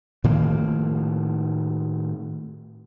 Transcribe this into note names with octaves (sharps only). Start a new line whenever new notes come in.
A2 D#3 F3 A#3